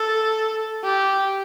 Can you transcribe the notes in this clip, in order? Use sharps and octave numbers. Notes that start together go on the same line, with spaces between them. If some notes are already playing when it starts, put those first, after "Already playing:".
Already playing: A4
G4